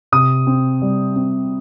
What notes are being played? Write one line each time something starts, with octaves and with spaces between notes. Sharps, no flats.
C3 D#6
C4
G3
C4